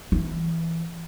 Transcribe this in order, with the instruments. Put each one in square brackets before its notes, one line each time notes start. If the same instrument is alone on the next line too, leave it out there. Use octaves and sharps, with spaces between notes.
[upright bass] E3